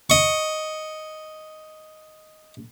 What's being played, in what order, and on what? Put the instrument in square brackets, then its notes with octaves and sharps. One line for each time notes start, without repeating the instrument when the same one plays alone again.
[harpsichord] D#5 C#6